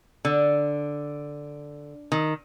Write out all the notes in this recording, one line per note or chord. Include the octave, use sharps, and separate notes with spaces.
D3
D#3